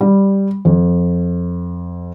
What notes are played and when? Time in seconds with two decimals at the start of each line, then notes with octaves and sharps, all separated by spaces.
0.01 G3
0.65 F2